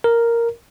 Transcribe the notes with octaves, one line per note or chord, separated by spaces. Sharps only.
A#4